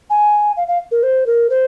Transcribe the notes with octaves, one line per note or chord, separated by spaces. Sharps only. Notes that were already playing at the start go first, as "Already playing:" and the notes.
G#5
F5
F5
A#4
C5
A#4
C5